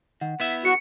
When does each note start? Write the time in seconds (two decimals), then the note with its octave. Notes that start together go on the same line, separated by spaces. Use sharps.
0.21 D#3 F#5
0.40 B3 E4 E5
0.65 F#4 C#7